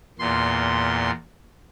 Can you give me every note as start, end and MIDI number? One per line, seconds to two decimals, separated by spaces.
0.19 1.11 40
0.19 1.11 46
0.19 1.11 84